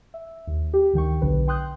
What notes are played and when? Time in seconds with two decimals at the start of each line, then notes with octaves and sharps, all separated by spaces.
0.14 E5
0.47 D#2
0.74 G4
0.93 D2 D#3 G5 C#6
1.22 B1 D3 B4
1.48 G5 C6 D#6 F#6 G6